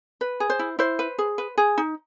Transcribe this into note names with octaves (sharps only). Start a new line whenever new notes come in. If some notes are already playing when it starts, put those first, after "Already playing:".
B4
G#4
C5
E4
E4 C5
B4
G#4
B4
G#4
D#4